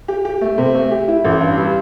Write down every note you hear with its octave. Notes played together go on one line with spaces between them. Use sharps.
G4
G4
A3
C3
A3
G4
E4
A1
G2
G3